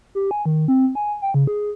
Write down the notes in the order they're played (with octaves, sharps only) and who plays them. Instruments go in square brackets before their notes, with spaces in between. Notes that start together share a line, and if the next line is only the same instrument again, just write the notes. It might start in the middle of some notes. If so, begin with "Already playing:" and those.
[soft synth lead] G4
G#5
D#3
C4
G#5
G5
C#3
G#4